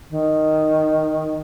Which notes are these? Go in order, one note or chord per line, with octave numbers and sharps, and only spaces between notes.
D#3